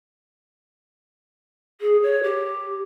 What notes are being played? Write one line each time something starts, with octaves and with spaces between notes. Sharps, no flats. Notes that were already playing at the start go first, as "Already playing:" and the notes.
G#4
C#5
G4